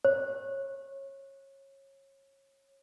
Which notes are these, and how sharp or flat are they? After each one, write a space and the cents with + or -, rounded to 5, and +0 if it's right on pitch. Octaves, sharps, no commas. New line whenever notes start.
C#5 -25